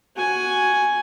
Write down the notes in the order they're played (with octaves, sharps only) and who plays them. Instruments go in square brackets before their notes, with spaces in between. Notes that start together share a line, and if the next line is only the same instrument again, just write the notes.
[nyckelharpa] F#4 G#5